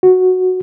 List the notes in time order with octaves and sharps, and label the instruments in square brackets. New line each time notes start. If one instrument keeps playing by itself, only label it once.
[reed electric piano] F#4